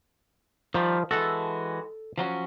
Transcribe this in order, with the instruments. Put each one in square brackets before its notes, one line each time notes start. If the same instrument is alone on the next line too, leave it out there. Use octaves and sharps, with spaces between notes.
[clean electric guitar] D#3 G3 [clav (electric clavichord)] F3
[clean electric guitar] E3 G#3 F#4 [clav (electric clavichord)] A4
[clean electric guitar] F3 F#3 C#4